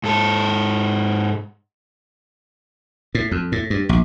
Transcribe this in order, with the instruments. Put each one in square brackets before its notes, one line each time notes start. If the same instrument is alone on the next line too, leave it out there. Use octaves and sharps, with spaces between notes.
[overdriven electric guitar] G#2 A4
[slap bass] A2
F2
A2
G2
A#1